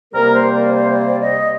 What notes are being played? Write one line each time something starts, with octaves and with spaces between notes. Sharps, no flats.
C3 G3 A#3 A#4
C5
D5
C5
D5
D#5